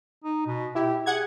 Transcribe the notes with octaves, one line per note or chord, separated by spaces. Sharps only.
D#4
B2
E4 G4
G#4 F#5 G#6